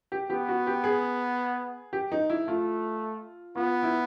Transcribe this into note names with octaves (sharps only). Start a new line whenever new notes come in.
G4
B3 G4
F#4
G4
G#4
G4
D#4
E4
A3 F4
B3 F4
E4